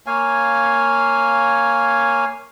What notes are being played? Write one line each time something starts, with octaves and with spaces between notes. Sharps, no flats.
A#3 C#5 F5 G#5